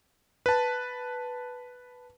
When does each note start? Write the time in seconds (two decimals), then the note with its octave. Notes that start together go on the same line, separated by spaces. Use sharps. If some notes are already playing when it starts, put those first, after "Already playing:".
0.46 B4 A5